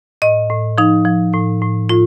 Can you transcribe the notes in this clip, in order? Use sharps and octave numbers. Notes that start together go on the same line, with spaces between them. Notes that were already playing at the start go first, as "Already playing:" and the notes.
A2 D#5
A2
F3 D#4
F3
A2
A2
A2 F4